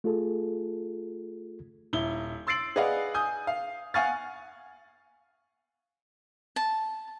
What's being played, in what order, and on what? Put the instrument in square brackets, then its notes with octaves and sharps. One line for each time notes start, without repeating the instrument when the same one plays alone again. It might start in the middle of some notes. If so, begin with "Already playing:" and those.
[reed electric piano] A3 F4 G#4 A4
[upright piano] D#1 E4 G7
C6 E6 A6 C7 D7 F#7
G#4 B4 D5 D#5 F5 F#5
G#5 D#6 G6
F5
F5 F#5 G#5 C#6 F6 A6
[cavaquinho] A5